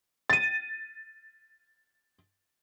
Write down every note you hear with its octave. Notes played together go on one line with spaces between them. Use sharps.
A6 D#7